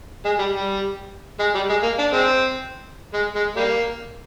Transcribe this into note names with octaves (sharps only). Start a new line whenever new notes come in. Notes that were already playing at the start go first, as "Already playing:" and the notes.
G#3
G3
G3
G#3
G3
G#3
A#3
D4
G#3 C4
G#3
G#3
G3 A#3